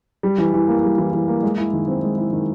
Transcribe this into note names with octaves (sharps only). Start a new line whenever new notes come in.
G3
E3
E3
A#3
G3
E3
E3
A#3
G#3
E4
D#3
C4
G#3
E4
D#3